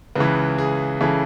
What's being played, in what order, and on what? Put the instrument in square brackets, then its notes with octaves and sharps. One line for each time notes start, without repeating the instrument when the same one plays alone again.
[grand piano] C#2 C#3 E3 B4
G#4
C#3 E3 A4